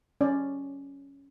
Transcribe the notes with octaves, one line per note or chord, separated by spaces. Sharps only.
C#4 D5